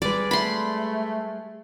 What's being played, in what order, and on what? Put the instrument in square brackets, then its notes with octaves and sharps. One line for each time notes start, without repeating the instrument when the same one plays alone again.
[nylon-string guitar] G3 G#3 B4 [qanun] D5
[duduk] A3 [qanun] B5 C6